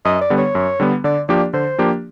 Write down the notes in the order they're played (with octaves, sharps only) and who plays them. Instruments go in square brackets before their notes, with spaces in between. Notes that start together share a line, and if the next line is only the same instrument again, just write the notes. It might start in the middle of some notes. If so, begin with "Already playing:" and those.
[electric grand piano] F#2 [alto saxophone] D#5
[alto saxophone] D5
[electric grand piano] D3 G3 B3
[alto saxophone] C#5
[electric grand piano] F#2
D3 G3 B3
[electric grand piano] D3 [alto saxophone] D5
[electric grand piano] F3 A#3 D4 G4 [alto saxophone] D5
[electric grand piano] D3 [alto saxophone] C5
[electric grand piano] F3 A#3 D4 G4